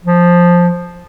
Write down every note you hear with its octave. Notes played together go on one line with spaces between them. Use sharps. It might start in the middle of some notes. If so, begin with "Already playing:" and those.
F3